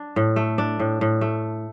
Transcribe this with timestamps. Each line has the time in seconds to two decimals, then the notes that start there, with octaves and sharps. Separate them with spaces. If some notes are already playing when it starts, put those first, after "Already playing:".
Already playing: D4
0.16 A2
0.36 A3
0.58 D4
0.79 A2
1.01 A2
1.21 A3